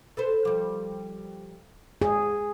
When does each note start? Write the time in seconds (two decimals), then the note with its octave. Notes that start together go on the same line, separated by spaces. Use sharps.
0.17 A4 B4 C5
0.45 F3 G3
2.02 G#2 G#4